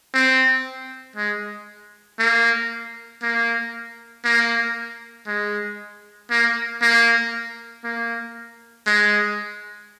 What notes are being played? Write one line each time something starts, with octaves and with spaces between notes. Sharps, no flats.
C4
G#3
A#3
A#3
A#3
G#3
A#3
A#3
A#3
G#3